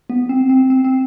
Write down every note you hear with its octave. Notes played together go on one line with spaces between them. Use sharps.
B3
C4
C4
C4
C4